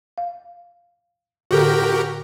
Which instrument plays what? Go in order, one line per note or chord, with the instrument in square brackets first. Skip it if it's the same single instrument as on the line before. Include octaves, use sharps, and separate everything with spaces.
[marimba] F5
[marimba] A2 D3 A4 [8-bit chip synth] F#4 G4 A#4